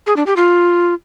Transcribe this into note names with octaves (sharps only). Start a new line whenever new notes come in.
G#4
D4
G4
F4